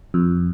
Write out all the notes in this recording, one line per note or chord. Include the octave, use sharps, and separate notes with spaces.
F2